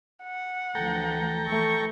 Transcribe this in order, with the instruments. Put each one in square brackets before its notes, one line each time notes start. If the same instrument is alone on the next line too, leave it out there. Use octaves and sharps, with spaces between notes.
[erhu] F#5
[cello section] D2 E3 F3 [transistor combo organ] A4 G5 A#5
[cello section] E3 [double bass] A3 [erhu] C#6